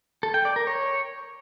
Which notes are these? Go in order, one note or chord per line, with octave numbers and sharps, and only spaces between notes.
A4
G5
D5
A#4
C#5